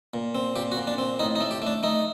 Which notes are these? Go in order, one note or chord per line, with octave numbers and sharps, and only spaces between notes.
A#2
C4
A#2 G4
F#4
A#2
D4
C4
A2 D#4
D#4
A3
G4
A3 D4
A3 D#4